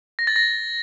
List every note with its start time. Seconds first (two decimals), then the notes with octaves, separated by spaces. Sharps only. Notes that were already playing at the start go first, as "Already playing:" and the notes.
0.19 A#6
0.27 A6
0.36 A#6